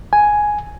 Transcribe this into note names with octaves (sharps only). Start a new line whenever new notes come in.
G#5